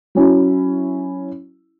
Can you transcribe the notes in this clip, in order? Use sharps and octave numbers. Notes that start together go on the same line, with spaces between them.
F#3 C#4 E4